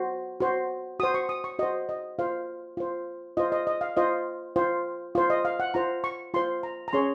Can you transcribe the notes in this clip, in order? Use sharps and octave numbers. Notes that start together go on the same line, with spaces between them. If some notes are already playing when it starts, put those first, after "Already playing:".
Already playing: F#4 C5
F#4 C5
F#4 C5 D#6
C#6
D#6
C#6
F#4 C5 D#5
D#5
F4 C5 F5
F4 C5
F4 C5 D#5
D#5
D#5
F5
F4 C5 D#5
F4 C5
F4 C5
D#5
F5
F#5
F4 C5 A#5
C#6
F4 C5 C6
A#5
A#5
C#4 G#4 C#5 C6